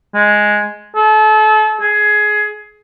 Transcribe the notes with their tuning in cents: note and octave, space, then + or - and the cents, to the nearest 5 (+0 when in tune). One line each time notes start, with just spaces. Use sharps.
G#3 +5
A4 -35
G#4 +15